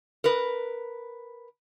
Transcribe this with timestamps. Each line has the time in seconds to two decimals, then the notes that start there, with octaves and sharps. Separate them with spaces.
0.24 A#4 B4